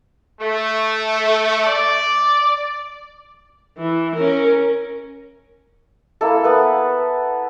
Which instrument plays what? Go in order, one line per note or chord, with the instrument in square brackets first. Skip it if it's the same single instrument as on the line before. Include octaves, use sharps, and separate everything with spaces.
[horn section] A3
D5
[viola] E3
C#4 A#4
[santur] A#3 E4 A4
B3 B4